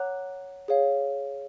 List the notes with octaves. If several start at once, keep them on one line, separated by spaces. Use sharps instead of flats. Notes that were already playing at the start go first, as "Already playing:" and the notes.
Already playing: C#5 F#5 A#5 D6 F#6
G#4 C#5 F5